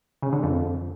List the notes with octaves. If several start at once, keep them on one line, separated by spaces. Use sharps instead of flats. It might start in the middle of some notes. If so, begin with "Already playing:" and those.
C#3
D3
F2